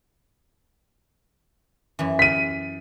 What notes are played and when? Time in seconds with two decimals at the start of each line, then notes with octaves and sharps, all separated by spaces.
1.99 F#2 E3
2.19 B6 D#7